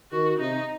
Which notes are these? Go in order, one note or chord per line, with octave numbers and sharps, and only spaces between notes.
D#3 F#4
C3 D#4